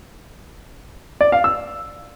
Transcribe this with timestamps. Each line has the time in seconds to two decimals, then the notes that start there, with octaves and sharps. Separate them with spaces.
1.21 D5
1.32 F5
1.44 E6